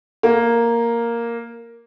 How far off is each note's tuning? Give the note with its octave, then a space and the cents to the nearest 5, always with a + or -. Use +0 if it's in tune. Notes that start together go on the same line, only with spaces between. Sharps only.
A#3 +0 F5 +0